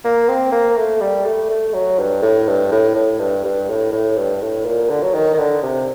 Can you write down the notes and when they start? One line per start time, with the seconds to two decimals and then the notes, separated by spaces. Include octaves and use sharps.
0.04 A#3
0.29 C4
0.52 A#3
0.77 A3
1.01 G3
1.25 A3
1.49 A3
1.73 F#3
1.99 G2
2.22 A2
2.47 G2
2.72 A2
2.95 A2
3.19 G2
3.45 G2
3.68 A2
3.92 A2
4.17 G2
4.42 A2
4.65 A#2
4.89 D3
5.03 F#3
5.14 D#3
5.34 D#3
5.38 D3
5.63 C3